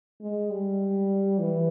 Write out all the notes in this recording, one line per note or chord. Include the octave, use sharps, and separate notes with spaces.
G#3
G3
E3